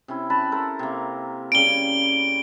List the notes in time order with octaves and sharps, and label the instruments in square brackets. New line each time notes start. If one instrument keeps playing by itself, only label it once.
[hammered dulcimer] C3 C#4 E4
B4 A5 B5
A4 A#4 C5
C3 A#3
[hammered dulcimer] C#3 G3 C#4 [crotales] D7 G7